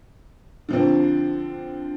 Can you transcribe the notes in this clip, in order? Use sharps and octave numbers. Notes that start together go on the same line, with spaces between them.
D3 F3 C4